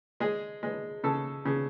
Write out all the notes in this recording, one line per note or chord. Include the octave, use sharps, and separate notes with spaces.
G#3 G#4
G#3
C#3 A4
C#3